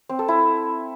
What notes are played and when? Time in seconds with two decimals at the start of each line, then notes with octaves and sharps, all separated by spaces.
0.09 C4
0.19 A4
0.28 E4